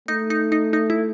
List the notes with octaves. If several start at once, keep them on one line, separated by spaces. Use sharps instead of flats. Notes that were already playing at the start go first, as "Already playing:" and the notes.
A3 D#4
D#4
D#4
D#4
E4